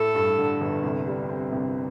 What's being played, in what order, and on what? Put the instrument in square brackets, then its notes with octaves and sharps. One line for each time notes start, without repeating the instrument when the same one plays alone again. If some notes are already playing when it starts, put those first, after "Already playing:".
Already playing: [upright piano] A2 A3 [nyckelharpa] A4
[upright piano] G2
D3
G1
C2
G3
C4
C2